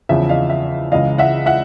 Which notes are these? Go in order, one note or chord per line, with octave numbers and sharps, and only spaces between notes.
E2 C#3 F3 E5
D#5 F5
E5
C#2 C#3 E3 D#5 F5
E5 F#5
E5 F#5